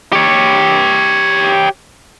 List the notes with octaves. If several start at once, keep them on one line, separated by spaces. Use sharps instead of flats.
G4 C#5